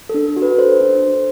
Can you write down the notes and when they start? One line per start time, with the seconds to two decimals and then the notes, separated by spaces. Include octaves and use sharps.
0.09 D4 A4
0.36 F#4
0.42 B4
0.58 A4 C5
0.81 D4
1.02 D4